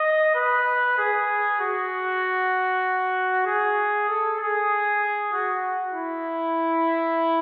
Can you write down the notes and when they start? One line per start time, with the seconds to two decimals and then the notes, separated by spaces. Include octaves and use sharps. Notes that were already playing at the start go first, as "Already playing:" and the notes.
Already playing: D#5
0.35 B4
0.98 G#4
1.60 F#4
3.46 G#4
4.09 A4
4.40 G#4
5.33 F#4
5.94 E4